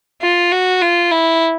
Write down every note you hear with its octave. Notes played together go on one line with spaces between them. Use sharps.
F4
F#4
F4
E4